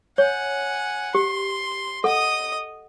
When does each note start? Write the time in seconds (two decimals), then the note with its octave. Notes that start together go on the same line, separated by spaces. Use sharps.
0.18 C#5 F#5 G#5
1.15 G4 C6
2.04 A4 D#5 F#5 D#6